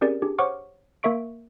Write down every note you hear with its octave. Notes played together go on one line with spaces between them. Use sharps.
C4 C#4 G4 G#4 A#4 D5
D4 G4 G#4
C5 C#5 F#5 C#6 D6 F6
A#3 A#4 E5 C#6 D7